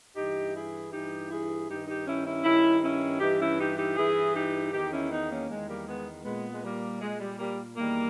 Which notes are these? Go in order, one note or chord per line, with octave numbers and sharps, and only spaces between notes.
G2 E3 D#4 G4
E4 G#4
G2 E3 D#4 G4
E4 G#4
G2 D#3 D#4 G4
D#4 G4
C#4 E4
C#4 E4
G2 D#3 C#4 E4
C#4 E4
G2 E3 D#4 G4
C#4 E4
D#4 G4
D#4 G4
G2 E3 E4 G#4
D#4 G4
E2 D#3 D#4 G4
C#4 E4
B3 D#4
A#3 C#4
E2 D#3 G#3
G3 A#3
G#3 B3
A#2 G#3 B3
G#3
G3 A#3
A#2 G#3
G3
G3 A#3
E2 D#3 G3 A#3